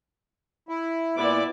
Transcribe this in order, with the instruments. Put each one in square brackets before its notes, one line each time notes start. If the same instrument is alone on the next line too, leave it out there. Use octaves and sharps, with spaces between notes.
[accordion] E4
[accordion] A#2 D6 [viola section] B3 E4 D5